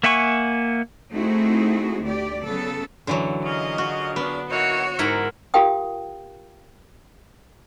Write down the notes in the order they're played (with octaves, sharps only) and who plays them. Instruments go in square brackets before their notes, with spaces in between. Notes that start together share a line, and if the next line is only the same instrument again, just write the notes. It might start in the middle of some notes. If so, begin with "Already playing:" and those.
[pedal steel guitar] A#3 E5 F#5 G#5 C#6
[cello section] A3 C4 D#4 E4 F#4 G#4
D2 G4 D5
C#3 F#3 B3 A4
[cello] F#2 [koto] D3 E3 F#3
[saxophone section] A#2 C#3 C#4 [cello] D#5
[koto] F#4
[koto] B3 [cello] D4
[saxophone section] E3 A#3 D#4 [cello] F#4 C#5
[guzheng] G#2 A#4 F#5 [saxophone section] G#3 E4
[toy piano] F4 G4 A#4 F5 G5 D#6